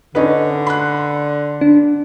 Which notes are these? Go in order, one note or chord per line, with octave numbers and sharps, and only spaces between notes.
D3 C#4 D#4 B4
B5 C6 F#6
D4